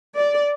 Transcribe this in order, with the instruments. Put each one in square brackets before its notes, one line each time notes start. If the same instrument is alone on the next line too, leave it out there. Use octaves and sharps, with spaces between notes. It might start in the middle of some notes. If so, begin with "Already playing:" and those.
[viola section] D5